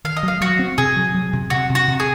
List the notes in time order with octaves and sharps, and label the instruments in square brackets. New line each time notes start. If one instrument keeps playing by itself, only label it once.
[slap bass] D#3 [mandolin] F5
[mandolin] D#5
[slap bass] F#3 [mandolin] F5
[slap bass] F#3 [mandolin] F#4
[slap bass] C4
[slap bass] C3 [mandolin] G#4
[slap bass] F#3
F#3
C3
[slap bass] C3 [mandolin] F#4
[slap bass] C3
[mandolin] F#4
[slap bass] C3
[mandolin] G#4